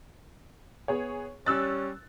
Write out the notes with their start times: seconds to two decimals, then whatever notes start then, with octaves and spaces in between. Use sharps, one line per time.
0.88 B3 G#4 C#5
1.46 G3 C#4 E6 F#6 A6